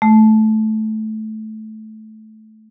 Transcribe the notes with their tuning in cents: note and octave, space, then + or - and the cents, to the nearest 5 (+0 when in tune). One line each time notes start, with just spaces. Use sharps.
A3 -15